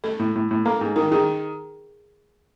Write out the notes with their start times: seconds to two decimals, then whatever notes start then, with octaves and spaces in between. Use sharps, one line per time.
0.04 A3 A4
0.19 A2
0.36 A2
0.51 A2
0.65 A#3 A4
0.81 G#2
0.96 D#3 A#4
1.11 D#3 G#4